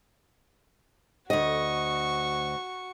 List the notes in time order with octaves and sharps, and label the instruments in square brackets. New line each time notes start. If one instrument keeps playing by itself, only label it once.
[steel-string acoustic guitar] D2 D#5 [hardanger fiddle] F#4 C#6